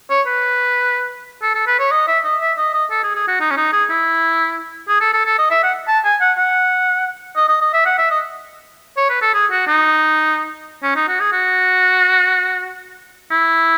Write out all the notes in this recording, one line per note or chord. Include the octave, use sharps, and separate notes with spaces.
C#5
B4
A4
A4
B4
C#5
D#5
E5
D#5
E5
D#5
D#5
A4
G#4
G#4
F#4
D#4
C#4
D#4
G#4
E4
G#4
A4
A4
A4
D#5
E5
F#5
A5
G#5
F#5
F#5
D#5
D#5
D#5
E5
F#5
E5
D#5
C#5
B4
A4
G#4
F#4
D#4
C#4
D#4
F#4
G#4
F#4
E4